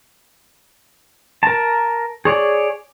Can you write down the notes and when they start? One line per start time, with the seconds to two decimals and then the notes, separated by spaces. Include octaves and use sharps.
1.43 A#4 A5
2.25 G#4 C#5 D5